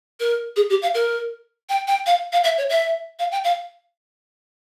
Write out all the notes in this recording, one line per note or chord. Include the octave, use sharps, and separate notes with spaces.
A#4
G#4
G4
F5
A#4
G5
G5
F5
F5
E5
C#5
E5
F5
G5
F5